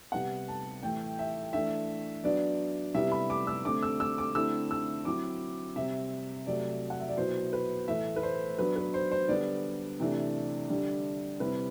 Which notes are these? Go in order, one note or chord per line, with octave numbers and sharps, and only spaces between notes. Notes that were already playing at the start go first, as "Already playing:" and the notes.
C3 G3 B3 F#5
A5
A2 E3 A3 G5
E5
E3 A3 D4 E5
F#3 B3 D4 D5
C3 G3 B3 E4 E5
B5
D6
E6
D3 A3 C4 D6
E6
E6
D6
D3 A3 C4 E4 E6
E6
F#3 C4 E4 D6
C3 G3 C4 E5
C3 F#3 A3 D5
F#5
E5
D5
B2 F#3 B3 E4 C5
B4
A2 E3 A3 E5
B4
C5
F#3 B3 D4 B4
B4
C5
C5
D3 G3 B3 D5
C3 E3 A3 D4
D3 G3 D4
C3 G3 C4 E4 B4